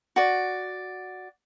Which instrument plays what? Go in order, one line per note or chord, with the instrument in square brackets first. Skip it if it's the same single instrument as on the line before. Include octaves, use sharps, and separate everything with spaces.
[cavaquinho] F#4 D5